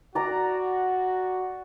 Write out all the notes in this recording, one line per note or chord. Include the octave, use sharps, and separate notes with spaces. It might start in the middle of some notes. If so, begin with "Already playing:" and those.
F#4 D5 A#5